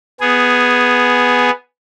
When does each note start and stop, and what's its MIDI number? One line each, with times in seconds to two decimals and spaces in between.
0.21 1.50 59
0.21 1.50 68